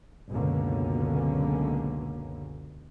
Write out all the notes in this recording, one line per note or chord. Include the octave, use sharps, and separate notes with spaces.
C#2 F#2 B2 D3 A#3 C#4